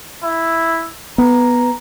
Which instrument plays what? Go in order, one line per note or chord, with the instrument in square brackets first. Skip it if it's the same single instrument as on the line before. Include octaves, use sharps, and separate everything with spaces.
[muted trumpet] E4
[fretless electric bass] B3 [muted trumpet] A#5